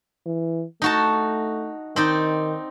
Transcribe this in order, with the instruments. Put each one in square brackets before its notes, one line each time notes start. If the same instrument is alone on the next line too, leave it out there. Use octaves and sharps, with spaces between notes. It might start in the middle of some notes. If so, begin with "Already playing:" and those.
[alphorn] E3
[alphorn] A3 [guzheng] D#4 F#4 A5
[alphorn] D#3 [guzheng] C4 D#4 D5